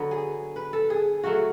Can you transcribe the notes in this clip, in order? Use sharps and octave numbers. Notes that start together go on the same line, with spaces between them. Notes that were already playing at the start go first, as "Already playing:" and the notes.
Already playing: D3 F#3 B3
G#4
B4
A4
G#4
C#3 F#3 A3 F#4